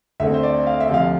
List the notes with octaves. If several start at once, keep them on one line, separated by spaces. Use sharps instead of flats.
D2 D3 A3 C4 E5
C5
D5
F5
E5
D2 C3 F3 F5